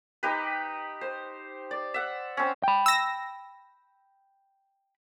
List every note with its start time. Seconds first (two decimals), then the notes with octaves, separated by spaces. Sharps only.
0.23 D#4 G4 B4
1.01 C5
1.71 D5
1.94 E5 F#5
2.37 C4 C#4
2.64 G5 B5
2.86 E6 A#6